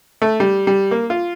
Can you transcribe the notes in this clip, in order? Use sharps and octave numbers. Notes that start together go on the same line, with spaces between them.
A3
G3
G3
A#3
F4